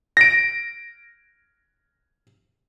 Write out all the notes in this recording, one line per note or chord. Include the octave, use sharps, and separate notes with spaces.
A#6 D7